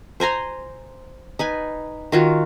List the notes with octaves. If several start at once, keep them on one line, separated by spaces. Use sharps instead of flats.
C5 G#5 A#5 C6
D#4 B4 G#5
D#3 F4 F#4